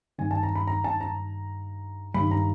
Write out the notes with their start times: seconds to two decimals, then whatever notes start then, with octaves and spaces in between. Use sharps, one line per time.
0.18 G2 D#3 G#5
0.31 A5
0.43 A#5
0.55 B5
0.67 A#5
0.84 A5
1.01 A#5
2.14 G2 D#3 B5
2.31 A#5